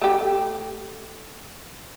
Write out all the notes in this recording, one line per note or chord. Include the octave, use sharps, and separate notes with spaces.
A3 G4